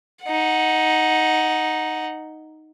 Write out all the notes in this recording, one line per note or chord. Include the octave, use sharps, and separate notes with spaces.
D#4 F#5